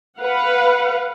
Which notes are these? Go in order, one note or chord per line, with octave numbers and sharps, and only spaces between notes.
B4 F5 F#5